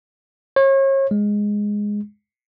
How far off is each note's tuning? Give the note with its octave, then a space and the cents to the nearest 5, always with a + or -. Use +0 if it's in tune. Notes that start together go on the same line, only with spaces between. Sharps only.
C#5 -35
G#3 -5